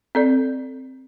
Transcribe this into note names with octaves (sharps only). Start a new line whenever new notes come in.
C4 A4 D5